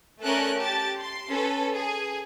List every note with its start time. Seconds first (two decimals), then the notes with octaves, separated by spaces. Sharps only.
0.23 A3 C#4 A4 A#4 D5 F#6
0.57 G4 A5 A6
1.01 C6
1.30 C#4 A4 B4
1.76 G#4